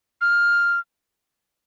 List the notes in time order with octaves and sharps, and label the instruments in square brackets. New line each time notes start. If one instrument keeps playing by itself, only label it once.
[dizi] F6